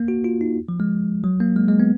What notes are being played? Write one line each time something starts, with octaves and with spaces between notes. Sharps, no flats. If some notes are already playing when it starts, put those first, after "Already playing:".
Already playing: A#3
F#4
F4
D#4
F3
G#3
F#3
A#3
G#3
G#3
B3